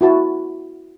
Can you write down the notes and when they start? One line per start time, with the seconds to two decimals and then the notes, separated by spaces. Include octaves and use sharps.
0.01 E4 F#4 A5